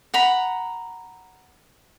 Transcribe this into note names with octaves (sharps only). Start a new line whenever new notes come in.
F#5 A#5 B5